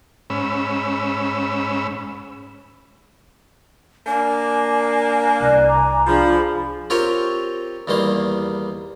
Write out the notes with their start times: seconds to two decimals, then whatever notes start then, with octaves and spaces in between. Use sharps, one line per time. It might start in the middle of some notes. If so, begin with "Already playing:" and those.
0.30 G#2 C#4 B5 E6
4.07 A#3 D4 G#5
5.40 C2 D5 F6 F#6
5.66 A#5 D6
6.07 F3 D4 F4 G#4 B5
6.90 C4 F4 G4 A#4 C#5
7.88 E2 D#3 G3 A#3 C6